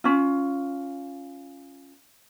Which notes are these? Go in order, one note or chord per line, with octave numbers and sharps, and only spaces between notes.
C#4 F4